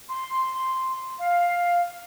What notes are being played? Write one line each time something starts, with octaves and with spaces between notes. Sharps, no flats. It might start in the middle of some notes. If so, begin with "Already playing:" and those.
C6
F5